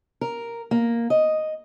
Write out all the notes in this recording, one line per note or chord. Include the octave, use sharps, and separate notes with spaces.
A#4
A#3
D#5